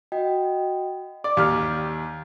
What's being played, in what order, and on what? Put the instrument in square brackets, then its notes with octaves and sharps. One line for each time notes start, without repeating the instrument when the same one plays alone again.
[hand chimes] F#4 D#5 G5
[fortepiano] D5 [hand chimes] D6
[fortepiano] D#2 G4 F6